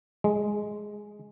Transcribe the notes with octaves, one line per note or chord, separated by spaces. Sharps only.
G#3